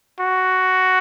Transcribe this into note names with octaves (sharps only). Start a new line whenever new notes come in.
F#4